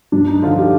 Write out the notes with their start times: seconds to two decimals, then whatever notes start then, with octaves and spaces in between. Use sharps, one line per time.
0.12 G2 D4
0.28 D#4
0.42 D3 F3 F4
0.58 G4